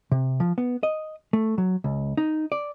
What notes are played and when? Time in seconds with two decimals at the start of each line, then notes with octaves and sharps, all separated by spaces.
0.12 C3
0.40 F3
0.58 B3
0.83 D#5
1.33 A3
1.58 F#3
1.84 C#2
2.17 D#4
2.52 D5